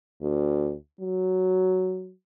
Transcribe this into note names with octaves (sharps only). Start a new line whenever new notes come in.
D2
F#3